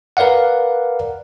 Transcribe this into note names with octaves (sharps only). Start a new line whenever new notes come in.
A#4 B4 D5 F5 F#5